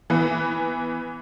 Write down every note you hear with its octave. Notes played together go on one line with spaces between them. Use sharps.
E3 B3